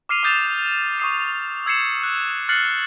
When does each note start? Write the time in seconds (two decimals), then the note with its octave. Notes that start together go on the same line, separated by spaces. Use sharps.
0.09 D6 F6 C7 D#7 F7
0.23 D6 D#6 G6 A6 E7 F7
1.00 C#6 D#6 C7
1.66 E6 G#6 C7 C#7 E7
2.03 F#6
2.49 F6 F#6 A6 C7 C#7 F#7